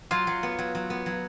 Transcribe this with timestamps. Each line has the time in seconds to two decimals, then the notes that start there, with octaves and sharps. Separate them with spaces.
0.11 F#3 F4
0.27 F#3
0.43 B3
0.58 F#3
0.75 F#3
0.90 B3
1.06 F#3